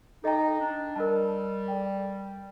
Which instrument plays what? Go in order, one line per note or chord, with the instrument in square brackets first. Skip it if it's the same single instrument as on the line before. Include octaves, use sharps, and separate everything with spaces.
[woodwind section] D#4 [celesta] A4 D#5 G5 A#5
[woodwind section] D4
[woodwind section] G3 [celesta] A#4 D#5 A5
[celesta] A4 D5 G5